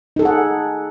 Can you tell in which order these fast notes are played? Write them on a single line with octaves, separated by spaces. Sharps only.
D#4 A4 G#4 F#5